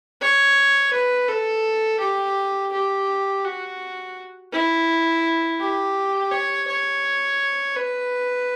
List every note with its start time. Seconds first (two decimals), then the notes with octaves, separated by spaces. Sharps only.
0.21 C#5
0.93 B4
1.28 A4
2.00 G4
2.73 G4
3.45 F#4
4.53 E4
5.60 G4
6.31 C#5
6.67 C#5
7.76 B4